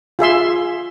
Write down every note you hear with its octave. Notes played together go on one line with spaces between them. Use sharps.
F4 G#4 E5 C6